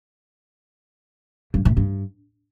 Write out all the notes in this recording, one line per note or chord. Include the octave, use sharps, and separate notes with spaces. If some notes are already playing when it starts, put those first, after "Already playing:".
G2
A2
G2